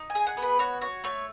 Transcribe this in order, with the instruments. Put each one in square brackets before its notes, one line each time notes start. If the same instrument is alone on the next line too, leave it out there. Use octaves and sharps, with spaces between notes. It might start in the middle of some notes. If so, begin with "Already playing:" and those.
Already playing: [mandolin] D#4
G#5
G#4
F#5
B3
B4
F#4 C#5
F#4 C#5
A3 C#5